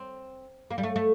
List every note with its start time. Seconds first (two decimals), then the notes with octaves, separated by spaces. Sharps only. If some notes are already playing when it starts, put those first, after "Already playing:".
Already playing: C4
0.71 A#3
0.78 G3
0.83 A3
0.96 A3